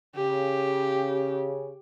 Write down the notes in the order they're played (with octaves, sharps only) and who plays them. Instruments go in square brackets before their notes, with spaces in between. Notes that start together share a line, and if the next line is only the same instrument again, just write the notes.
[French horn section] C#3 [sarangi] G4